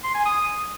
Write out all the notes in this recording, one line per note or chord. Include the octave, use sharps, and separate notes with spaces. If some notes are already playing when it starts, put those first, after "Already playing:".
C6
G#5
D#6